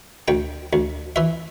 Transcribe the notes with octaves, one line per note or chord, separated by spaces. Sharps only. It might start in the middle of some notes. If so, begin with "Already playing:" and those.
D2 G5
D2
E3 E5